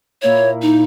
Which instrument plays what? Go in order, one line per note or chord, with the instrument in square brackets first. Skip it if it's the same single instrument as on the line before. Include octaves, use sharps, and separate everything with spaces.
[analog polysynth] A#2 A#3 E4 [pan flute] C#5
[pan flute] D#4